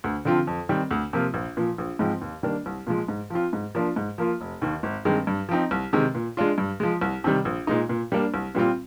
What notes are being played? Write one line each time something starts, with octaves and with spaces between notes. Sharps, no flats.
D2
D3 F3 C4 F4
F2
D#3 G3 C4
D2
C3 F3 A#3 F4
A#1
A#2 F3
A#1
G#2 F3 G#3 C4
D#2
D#3 G3 A#3 D4
C2
A#2 F3 G#3
G#2
F3 C4 F4
G#2
F3 A#3 D4 F4
G#2
F3 A#3 F4
F1
D#2 D#3
G#1
G2 D#3 G#3 C4
G2
F3 C4 D#4
C2
C3 D#3 G#3
A#2
G#3 D4 F4
G2
F3 G#3
C2
C3 D#3 G3
A#1
A#2 G#3 D#4
A#2
G3 A#3 D4
C2
A#2 G3 C4 F4